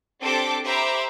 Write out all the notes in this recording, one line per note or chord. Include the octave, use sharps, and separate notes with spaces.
C4 D4 G4 A4 D6 G6
G4 C5 E5 A#5 B5 D6